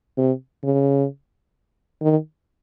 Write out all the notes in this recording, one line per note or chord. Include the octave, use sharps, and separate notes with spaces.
C3
C#3
D#3